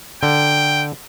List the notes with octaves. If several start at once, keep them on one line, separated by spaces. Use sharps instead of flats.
D3 G5